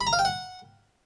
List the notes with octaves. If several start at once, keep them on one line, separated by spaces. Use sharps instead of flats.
B5
A#5
F5
G5
F#5